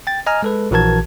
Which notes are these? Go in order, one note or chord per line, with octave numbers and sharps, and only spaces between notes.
G5 A6
D#5 G#5 A#5 F6
G#3 A4 B4
A#1 E3 F#4 A#4 A5 G#6